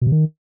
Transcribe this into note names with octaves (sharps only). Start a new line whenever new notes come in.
B2
C3
D#3